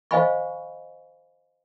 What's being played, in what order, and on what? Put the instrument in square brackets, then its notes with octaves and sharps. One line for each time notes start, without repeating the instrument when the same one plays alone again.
[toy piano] C5 D#5 F5 G#5 B5 C#6